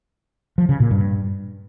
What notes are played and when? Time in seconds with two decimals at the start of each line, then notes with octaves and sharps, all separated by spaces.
0.58 F3
0.69 C#3
0.80 A#2
0.91 G2